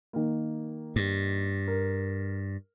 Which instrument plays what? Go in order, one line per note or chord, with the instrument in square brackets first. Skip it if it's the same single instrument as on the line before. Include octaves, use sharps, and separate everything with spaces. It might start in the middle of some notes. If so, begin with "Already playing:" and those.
[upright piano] D#3 A#3
[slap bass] G2
[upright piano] A#4